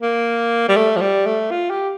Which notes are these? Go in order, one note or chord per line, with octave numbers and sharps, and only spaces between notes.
A#3
G3
A3
F3
G3
A3
F4
G4